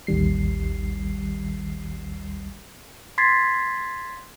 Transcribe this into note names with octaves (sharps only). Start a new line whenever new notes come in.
A1 D#2 D#3 G3 C7
C6 G#6 A6 B6 C7